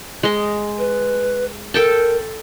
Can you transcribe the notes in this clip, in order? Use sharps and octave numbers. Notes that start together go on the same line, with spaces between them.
G#3 D#5
B4
A4 A#4 G5 A5